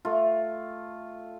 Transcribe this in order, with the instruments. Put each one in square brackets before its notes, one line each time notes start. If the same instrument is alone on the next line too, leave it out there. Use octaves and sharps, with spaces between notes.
[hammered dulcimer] A3 F4